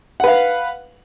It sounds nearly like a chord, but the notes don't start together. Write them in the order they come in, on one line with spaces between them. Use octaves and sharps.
F#5 B4 F5